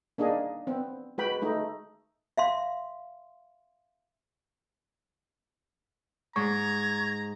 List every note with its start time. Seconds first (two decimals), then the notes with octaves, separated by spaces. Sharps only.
0.18 A#3 D4 D#4 G#4 D#5
0.67 B3 C4
1.18 G#3 F#4 B4 G5 B5
1.42 G#3 A3 D#4
2.37 E5 F5 C6
6.36 G#2 A#5 C#6 G#6